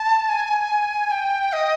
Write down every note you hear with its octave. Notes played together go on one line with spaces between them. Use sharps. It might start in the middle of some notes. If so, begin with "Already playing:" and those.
Already playing: A5
G#5
G5
D#5